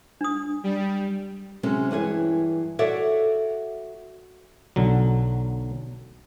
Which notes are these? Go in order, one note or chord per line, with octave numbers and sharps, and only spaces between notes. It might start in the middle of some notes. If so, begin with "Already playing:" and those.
D4 D#6
G3
C3 F#3 G#3 C4 C#4
G2 E3 G#4 C#5
F#4 A4 C#5 D5 E5 F#5
B1 D3 F#3